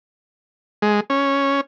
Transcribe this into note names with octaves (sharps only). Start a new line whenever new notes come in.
G#3
C#4